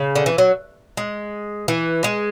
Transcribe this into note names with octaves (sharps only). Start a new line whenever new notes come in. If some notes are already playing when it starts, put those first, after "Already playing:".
Already playing: C#3
D3
E3
F#3
G#3
E3
G#3